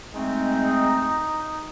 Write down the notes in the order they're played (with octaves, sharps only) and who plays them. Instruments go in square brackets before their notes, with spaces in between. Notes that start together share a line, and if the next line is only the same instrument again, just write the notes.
[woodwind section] G#3 A3 C4 [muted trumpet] D#4